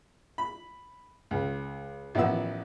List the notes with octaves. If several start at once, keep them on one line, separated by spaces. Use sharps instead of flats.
B5
C#2
A1 D#3 F3 B3 F#5 E6